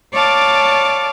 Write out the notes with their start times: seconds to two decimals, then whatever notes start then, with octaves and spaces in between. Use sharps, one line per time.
0.13 C#5 D5 F5 A5 D6